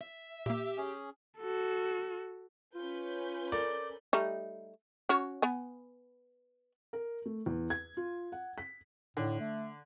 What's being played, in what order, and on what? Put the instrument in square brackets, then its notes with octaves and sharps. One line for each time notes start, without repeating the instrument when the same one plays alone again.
[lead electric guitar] E5
[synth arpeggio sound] A#2 A#3 [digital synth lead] G4 [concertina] E6
[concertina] C#4 G#4
[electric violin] F#4 A4
[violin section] C#4 B4 G6 [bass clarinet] F4
[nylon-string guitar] A4 A#4 [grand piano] D5
[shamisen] G3 A3 D#4
C#4 F#4 C#5
B3 G#5
[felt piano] A#4
A3
E2
G#6
F4
F#5
B6
[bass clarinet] A2 [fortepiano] D3
[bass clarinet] A3